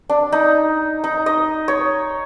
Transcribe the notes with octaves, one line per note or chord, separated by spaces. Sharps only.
D4
D#4
D#4
D#5
C#5